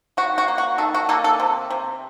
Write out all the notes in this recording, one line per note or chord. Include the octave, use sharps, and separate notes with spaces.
D#3 F#4
F#4
A#3
F#4
D#3 A4
F#4
A#3 A4
A4
C3
C3